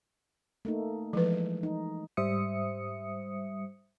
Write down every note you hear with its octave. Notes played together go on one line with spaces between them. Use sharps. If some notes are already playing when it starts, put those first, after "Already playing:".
A3 A#3 D#4
E3 F3 G#3 B4
D#4
G#2 G3 C5 E5 D#6 C#7